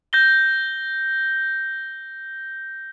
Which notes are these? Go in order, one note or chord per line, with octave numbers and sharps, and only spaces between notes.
G6 A#6 G7